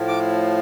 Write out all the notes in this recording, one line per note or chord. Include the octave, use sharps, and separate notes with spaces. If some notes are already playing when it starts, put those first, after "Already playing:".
Already playing: A2 F3
D6